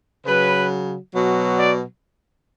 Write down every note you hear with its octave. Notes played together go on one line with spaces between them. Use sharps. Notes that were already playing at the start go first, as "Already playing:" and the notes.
C#3 F#3 B4
B2 F#3
D5